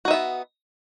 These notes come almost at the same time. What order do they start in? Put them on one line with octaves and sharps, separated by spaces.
F#4 D#4 E5 B3